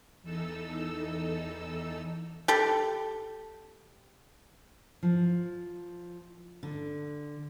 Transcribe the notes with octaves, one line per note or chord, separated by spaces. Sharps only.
E2 E3 D#4 A4 E6
G4 A4
F3
D3